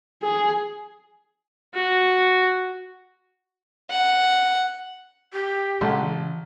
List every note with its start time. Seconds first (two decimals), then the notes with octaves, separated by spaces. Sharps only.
0.23 G#4
1.74 F#4
3.90 F#5
5.33 G4
5.81 A#1 C#3 G#3 A4 F#5 C6
6.03 E3